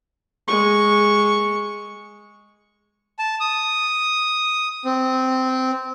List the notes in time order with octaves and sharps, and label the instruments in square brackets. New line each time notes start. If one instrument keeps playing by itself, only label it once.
[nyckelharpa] G#3 C#6
[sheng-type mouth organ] A5
D#6
C4